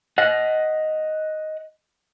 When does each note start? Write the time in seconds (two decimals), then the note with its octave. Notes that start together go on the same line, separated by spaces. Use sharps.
0.18 D#5 F#5